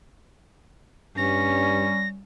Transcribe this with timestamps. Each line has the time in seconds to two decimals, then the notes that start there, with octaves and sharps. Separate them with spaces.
1.17 G2 G3 C#4 A#6